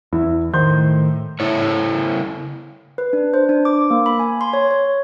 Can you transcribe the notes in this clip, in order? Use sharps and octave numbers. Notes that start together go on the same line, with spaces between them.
E2 E4
A2 D#3 C5 C6 G6
C#3 A3 E4 C#5
B4
D4
C5
D4
D6
A#3
B5
G#5
C6
C#5
C#5